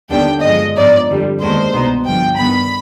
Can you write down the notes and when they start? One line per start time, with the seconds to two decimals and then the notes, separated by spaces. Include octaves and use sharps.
0.10 D#2 D3 G3 B3 D4 G5
0.43 G2 F3 G#3 D#5
0.76 G#2 F3 B3 D#4 D5
1.08 F2 D3 G3
1.41 D#2 D#3 G#3 B3 D4 C5
1.73 C2 B2 B3 D#4
2.06 G1 G2 F3 G5
2.39 G2 D#3 B3 B5